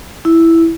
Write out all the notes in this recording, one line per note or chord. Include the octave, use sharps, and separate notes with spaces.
E4